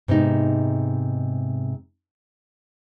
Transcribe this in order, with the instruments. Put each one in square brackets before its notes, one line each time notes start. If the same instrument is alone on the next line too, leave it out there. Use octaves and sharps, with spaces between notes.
[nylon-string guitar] G#2 C3 B3 D#4